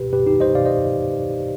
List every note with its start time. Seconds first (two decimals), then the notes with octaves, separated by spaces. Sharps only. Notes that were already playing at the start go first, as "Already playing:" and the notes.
Already playing: B2 G4 B4
0.13 B2 G4 B4
0.26 D#4 G4
0.40 C5 D#5
0.55 B2 D5 F5
0.65 C5 D#5